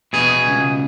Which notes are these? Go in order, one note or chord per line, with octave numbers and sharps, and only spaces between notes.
B2 G#4
C#2